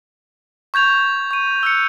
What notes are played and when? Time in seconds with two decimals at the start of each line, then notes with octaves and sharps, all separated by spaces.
0.74 C#6 G6 G#6 F7
1.31 C#6 D#7
1.63 E6 F#6 C#7